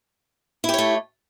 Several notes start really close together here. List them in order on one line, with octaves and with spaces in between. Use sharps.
E4 G4 C#5 A3